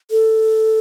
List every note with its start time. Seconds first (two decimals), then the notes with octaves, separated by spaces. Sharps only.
0.11 A4